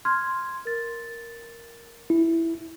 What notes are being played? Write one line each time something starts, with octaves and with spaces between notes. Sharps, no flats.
C6 F6 G#6
A#4 A6
E4